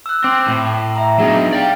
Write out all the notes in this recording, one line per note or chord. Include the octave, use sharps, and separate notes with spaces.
E6 F#6
C4 D6
A2
E5 A#5
F#3 B3 D4 D#4 G#4
D5 F5 G5